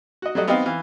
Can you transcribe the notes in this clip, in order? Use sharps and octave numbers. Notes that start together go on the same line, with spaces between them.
F#4 D#5
F#3 G3 A3 F#4 D#5
B3 C4 D#4 G4 D#5 F5
E3 F5